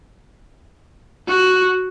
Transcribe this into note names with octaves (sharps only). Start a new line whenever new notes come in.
F#4